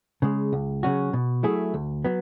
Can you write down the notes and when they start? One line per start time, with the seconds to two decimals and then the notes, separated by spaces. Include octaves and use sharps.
0.22 C#3 G#3
0.53 C#2
0.83 C#3 F#3 C#4 F#4
1.13 B2
1.43 F#3 A3 E4 G#4
1.74 D2
2.04 F#3 B3